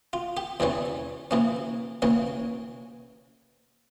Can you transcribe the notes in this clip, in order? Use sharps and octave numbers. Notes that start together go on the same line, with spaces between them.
F4
G4
E2 C3 E3 G3 C#4
C3 E3 A#3 C#4
C3 E3 A#3 C#4